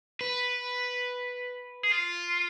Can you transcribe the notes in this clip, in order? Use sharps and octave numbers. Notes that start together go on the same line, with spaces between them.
B4
G#4
F4